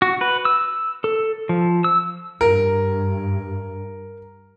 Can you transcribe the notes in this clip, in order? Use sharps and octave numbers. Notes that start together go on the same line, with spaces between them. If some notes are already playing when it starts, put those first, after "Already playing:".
F#4
B4
E6
A4
F3
E6
G2 A#4